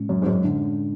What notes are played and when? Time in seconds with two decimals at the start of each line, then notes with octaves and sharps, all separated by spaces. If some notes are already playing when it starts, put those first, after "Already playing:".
Already playing: A2 G#3 C#4
0.09 F#2
0.22 G#2
0.27 F#2
0.44 D3